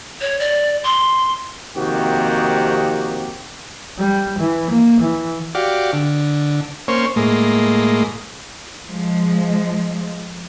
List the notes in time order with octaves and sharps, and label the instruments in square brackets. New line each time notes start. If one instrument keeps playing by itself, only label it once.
[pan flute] C#5
D5
C6
[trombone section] F2 C3 D#3 A#3 F#4 G4
[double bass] G3
E3
A#3
E3
[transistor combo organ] F#4 G4 D5 F5
D3
A#3 C#4 C5 C#5
A2 G#3 A#3
[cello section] F3 G#3